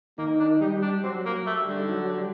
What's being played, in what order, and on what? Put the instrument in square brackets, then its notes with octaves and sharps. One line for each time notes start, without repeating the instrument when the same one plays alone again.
[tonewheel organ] D#3 D#4 [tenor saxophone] A#3
[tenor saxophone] D4
[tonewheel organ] G3 G4 [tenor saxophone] D#4
[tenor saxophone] D4
[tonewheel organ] F#3 F#4 [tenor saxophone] C4
[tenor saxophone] A#3
[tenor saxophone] A3 [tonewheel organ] G4
[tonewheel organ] G3 G4
[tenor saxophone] D3
[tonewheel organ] D#4
F#3 F#4
G3 G4